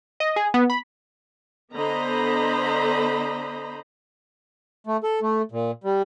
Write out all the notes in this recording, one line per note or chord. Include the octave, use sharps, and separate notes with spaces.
D#5
G#4
B3
B5
D3 B3 C5 D#5 A#5 B5
A3
A4
A3
A#2
G3